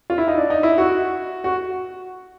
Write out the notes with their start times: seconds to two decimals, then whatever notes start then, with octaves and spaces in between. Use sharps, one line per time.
0.10 F4
0.18 E4
0.28 D#4
0.37 D4
0.50 D#4
0.63 E4
0.78 F#4
1.44 F#4